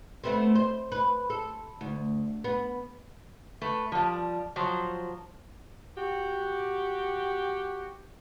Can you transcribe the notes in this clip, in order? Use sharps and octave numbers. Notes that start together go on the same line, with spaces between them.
A3 B3 C4
C5
B4
A4
D2
B3
A3 B4
F3 G3
F3 F#3 C5
F#4 G4